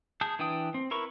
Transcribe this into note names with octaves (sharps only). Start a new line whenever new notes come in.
G#4 A5 G6
E3 D4 B4 G5 D#6
C4
E4 A#4 B4 C#6